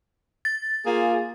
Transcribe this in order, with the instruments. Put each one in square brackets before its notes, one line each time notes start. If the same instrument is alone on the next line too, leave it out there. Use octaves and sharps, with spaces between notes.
[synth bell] A6
[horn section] A#3 F4 G#4